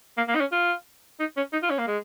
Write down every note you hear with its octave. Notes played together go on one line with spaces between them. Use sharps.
A#3
A#3
D#4
C#4
F4
D#4
C#4
D#4
F4
C#4
A#3
G#3